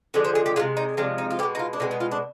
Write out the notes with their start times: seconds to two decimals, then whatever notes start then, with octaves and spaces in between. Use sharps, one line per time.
0.14 D3 F3 G#3 D5
0.25 C5
0.35 G#4
0.46 G4
0.56 C3 F3 G#3 F4
0.77 D#4
0.97 C3 F3 G#3 D4
1.18 D#4
1.30 F4
1.39 B2 G4
1.43 G#3
1.55 D#4
1.59 F4
1.73 D4
1.80 B2 G#3 C4
1.91 B3
2.00 F4
2.11 D4